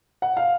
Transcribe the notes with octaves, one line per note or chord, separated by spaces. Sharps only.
F#5
F5